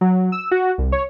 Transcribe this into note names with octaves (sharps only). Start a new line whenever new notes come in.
F#3
E6
F#4
C2
C#5